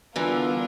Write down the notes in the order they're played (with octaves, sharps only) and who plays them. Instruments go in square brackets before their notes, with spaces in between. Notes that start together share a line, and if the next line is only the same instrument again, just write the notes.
[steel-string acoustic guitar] D3 E3 [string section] G3 B3 D4 F4 A#4